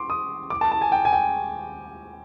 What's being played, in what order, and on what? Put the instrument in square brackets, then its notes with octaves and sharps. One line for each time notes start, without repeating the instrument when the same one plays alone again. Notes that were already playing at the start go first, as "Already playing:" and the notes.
Already playing: [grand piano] C6 D6
D#6
D6
A5
A5
G#5
G5
G#5
G5